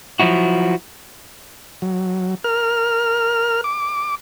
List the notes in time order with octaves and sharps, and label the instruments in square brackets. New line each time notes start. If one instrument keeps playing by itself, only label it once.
[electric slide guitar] F3 F#3 E4 F#4
[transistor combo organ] F#3
A#4 F6
D6